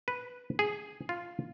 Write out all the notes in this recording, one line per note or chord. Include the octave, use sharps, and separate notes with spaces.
B4
G#4
F4